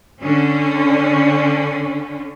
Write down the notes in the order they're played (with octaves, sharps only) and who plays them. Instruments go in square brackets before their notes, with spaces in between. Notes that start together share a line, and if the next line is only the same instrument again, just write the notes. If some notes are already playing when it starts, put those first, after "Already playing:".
[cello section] D3 C#4